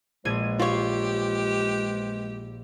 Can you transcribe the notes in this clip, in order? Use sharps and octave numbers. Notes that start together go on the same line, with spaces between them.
A#1 E3 F3 G#3 G#6 D#7
F4 G4 C#5